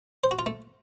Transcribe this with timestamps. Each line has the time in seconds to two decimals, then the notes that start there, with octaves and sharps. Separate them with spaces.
0.24 C5
0.31 F#4
0.39 F4
0.46 A3